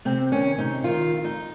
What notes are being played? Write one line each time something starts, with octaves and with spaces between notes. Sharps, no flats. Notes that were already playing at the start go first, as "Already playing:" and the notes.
C3 C4
D#3 C#4
C3 D#4
D#3 F4
F2
D#4